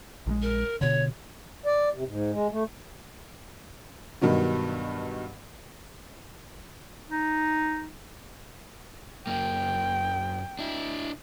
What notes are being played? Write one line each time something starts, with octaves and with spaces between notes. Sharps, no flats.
A#1 D#3 G#3
A#4
B2 D3 C#5
D5
C3
G#2
G#3
A3
G2 B2 D#3 F#3
D#4
F#2 A#3 G5
D4 E4